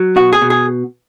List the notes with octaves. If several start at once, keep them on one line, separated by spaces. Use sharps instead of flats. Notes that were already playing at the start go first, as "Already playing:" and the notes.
Already playing: F#3
B2 F#4
G#4
B2
G#4